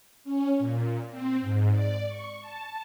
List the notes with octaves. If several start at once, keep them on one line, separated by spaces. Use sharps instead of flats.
C#4
A#2
C4
G#2
D5
C#6
A5